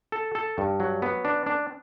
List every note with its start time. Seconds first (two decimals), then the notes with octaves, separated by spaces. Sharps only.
0.12 A4
0.35 A4
0.58 G2
0.80 F#3
1.02 B3
1.25 D4
1.46 D4